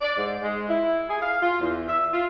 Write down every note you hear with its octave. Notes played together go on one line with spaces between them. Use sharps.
D5
G#2
G#3
E4
G#4
F5
F4
E2
E5
F4